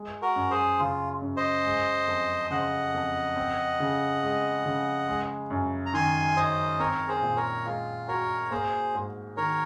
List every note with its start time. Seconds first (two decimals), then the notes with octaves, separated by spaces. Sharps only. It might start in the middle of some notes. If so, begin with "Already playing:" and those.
Already playing: G#3
0.22 F#4 A#4
0.36 F#2
0.51 G#4 C5
0.79 C#3 F4
1.22 F#2
1.37 C5 D#5
1.64 G#3
2.07 F2
2.50 C#3 D#5 F#5
2.94 F2
3.36 C4
3.80 C#3
4.23 G#3
4.66 C#3
5.08 G#3
5.50 F#2
5.86 A#5
5.94 D#3 G#5 C6
6.36 D#4 C5 D#5
6.79 C4 A#4 C#5
7.08 G#4 C5
7.23 A#2
7.36 A#4 C#5
7.66 G#3 F4
8.08 F#4 A#4 C#5
8.51 A#3 G#4 C5
8.95 G#2
9.37 D#3 A#4 C#5